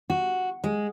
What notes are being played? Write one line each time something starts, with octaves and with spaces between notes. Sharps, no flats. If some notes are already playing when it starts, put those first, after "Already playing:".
F#4
G#3